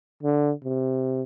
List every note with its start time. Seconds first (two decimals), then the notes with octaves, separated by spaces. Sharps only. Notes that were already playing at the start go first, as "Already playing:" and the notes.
0.23 D3
0.64 C3